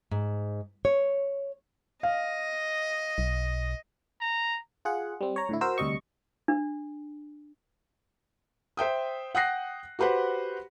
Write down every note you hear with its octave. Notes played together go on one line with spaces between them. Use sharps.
G#2
C#5
D#5 F5
B1
A#5
F4 G#4 F#5
G3 C4
C#5 A#5
A2 D3 E4
F#4 A#4 C5 E6
D2 C3 G3 D#5 C#6
D4
C5 E5 G5 D#6
F#5 G5 D#6 F#6 A#6 C7
F#4 G4 B4 C5 F#5